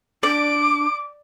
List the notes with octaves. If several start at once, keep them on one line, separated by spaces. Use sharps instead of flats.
D4 D5 D6 D7